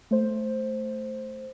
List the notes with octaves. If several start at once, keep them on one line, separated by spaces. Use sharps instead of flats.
A3 C5